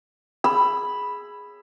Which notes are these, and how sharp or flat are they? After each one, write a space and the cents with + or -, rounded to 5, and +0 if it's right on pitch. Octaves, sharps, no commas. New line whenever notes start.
G#4 +0 B5 +0 E6 +20